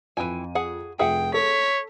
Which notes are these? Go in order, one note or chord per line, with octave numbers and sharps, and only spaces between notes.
F2 E3 G5 G#5 D#7
G#4 F#5
F1 F3 G#4 E5 F#5 G5
A4 C#5 B6